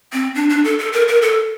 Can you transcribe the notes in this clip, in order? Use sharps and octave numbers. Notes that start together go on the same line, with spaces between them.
C4
D4
D4
A4
A4
A#4
A#4
A4